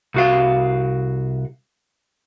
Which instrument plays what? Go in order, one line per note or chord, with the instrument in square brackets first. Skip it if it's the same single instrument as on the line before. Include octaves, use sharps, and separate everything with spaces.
[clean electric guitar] C2 F#4 F5